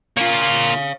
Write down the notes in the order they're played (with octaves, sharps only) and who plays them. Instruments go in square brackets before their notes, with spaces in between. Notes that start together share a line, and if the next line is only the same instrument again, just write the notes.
[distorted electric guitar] A#3 F4 [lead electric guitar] C#5 F5